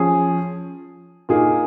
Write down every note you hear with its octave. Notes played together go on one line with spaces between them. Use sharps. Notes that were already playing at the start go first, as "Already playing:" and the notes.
Already playing: F3 C#4 G#4
A#2 A#3 D#4 G#4